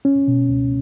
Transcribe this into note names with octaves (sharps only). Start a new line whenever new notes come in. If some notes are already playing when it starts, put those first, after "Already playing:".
C#4
B2
C#2